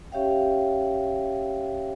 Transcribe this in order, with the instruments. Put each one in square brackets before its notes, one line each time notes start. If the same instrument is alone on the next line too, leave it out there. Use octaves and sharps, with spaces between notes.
[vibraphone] C#4 G4 C#5 E5 F5 G5